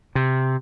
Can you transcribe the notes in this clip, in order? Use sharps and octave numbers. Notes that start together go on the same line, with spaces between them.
C3